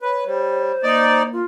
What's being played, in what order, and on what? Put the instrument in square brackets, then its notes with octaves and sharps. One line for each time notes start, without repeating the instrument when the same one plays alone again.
[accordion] B4 [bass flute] C#5
[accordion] G3 [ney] C5
[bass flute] A#3 [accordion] D#4 D5
[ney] F4